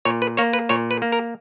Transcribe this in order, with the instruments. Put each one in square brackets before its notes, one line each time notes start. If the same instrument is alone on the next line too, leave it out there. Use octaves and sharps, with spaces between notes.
[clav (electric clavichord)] A#2 C#5
B4
A#3 C#5
B4
A#2 C#5
B4
A#3
A#4